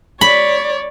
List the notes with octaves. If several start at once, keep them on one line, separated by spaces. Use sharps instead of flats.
C#5 D5 B5